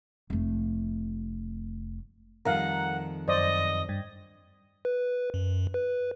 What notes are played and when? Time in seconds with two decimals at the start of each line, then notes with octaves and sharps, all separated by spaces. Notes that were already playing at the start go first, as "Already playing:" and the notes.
0.30 F1 A3
2.45 F2 D#3 G3 A#4 F5 F#5 A#5
3.28 F#2 C5 D5 D#5 A#6
3.89 G2
4.85 B4
5.34 F#2
5.74 B4